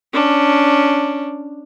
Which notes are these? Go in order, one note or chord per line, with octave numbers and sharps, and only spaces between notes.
C#4 D4